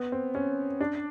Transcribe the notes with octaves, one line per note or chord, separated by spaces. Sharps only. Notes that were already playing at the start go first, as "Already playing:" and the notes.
Already playing: B3
C4
C#4
D4